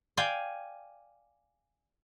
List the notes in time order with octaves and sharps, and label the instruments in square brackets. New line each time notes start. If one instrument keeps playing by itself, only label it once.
[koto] D5 F5 G5 G#5